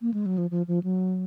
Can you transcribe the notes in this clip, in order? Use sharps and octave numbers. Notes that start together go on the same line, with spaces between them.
A#3
G#3
F#3
F3
F3
F3
F#3